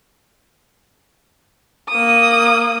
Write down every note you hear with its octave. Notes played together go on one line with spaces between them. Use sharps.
A#3 D#6